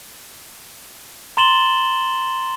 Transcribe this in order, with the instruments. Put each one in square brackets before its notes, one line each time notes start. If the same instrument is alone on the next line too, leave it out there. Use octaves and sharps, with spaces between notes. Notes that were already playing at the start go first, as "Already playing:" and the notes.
[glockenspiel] A#5 C6 A6 E7 F#7 G7